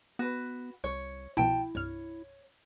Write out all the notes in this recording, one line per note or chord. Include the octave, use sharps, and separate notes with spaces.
B3 F#4 B4
C2 C#5
C2 B2 F3 E4 G5 A5
C2 G2 C#5 F6